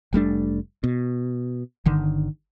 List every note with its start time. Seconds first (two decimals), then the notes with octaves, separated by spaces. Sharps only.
0.13 F1 G3 A3 D4
0.84 B2
1.86 G1 D3 D#3